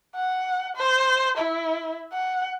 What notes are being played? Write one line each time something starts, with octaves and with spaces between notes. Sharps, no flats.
F#5
C5
E4
F#5